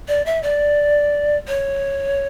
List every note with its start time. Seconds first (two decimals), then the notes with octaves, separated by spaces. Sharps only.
0.08 D5
0.26 E5
0.43 D5
1.48 C#5